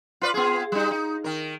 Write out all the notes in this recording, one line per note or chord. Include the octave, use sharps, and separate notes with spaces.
F4 B4 D5
B3 F4 G#4
G3 D#4
D#4
D#3 A#4